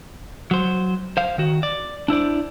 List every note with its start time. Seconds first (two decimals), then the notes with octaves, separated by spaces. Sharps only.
0.51 F#3 C5
1.17 C5 F5
1.38 D#3 F#4
1.63 D5
2.08 D4 E4 C5 D5